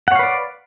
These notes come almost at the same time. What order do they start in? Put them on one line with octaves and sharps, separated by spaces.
F#5 C#5 F5 B4 D5